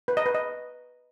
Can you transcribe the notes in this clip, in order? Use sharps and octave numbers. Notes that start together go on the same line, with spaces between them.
B4
D#5
B4
D#5